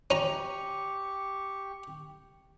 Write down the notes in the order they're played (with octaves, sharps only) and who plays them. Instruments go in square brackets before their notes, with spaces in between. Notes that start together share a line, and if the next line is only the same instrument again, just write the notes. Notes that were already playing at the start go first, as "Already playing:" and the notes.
[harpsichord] C#4 A#5 [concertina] G4 C#6